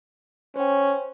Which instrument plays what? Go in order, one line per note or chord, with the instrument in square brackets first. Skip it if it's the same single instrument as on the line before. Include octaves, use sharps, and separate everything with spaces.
[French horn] C#4 [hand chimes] C5 G5